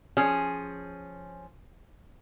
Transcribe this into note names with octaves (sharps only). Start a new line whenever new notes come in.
F3 C#4 G#4